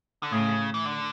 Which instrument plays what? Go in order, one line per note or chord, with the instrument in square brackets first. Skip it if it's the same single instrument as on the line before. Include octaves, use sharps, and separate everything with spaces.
[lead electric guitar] D3
[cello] A2 [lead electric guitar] C#3
[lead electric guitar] E3
D3